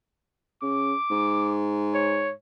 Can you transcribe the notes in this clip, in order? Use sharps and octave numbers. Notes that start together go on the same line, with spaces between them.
C#3 D6
G#2
C#5